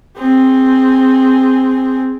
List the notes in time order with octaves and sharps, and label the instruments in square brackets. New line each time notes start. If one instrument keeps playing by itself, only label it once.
[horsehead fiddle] C4 G#4